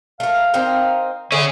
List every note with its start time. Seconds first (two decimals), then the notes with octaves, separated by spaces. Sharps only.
0.20 A3 A#4 F5
0.54 C4 D#4 A#4
1.32 D3 C#4 G#4 A4 E5